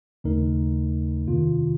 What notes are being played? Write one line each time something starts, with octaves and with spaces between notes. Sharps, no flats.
D#2 C#3 A3 D#4 A#4
F2 C3 D#3 A#3 F4